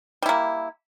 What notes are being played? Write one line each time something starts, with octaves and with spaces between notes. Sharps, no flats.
G3 A#3 E4